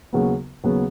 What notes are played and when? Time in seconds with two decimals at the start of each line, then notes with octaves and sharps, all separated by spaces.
0.13 D#2 C#3 F#3 B3
0.64 D#2 C#3 F#3 B3